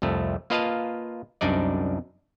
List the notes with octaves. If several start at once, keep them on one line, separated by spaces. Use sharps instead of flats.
C2 F2 A3
A#3 F4 B4 D#5 F5 A5
C2 F#2 D4 D#4 D5